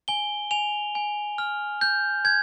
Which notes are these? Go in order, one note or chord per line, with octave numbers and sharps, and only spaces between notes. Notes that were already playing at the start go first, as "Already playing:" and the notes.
G#5 G7
G#5 F7
G#5
F6
G6
G6 G#6